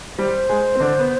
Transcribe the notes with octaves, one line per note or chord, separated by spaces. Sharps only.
G3 G4 C5
G#3 G#4
C4
D3 D4
B3